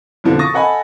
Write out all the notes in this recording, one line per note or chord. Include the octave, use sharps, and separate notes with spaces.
F2 B2 D3 F3
C#6 D#6 A6 A#6
A4 D#5 F#5 G#5 B5